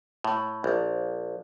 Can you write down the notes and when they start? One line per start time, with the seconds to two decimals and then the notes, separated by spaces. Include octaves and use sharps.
0.24 A2
0.64 A#1